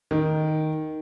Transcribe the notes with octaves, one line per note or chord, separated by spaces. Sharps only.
D#3